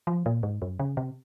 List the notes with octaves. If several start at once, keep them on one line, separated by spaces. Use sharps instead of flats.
F3
A#2
G#2
F#2
C#3
C3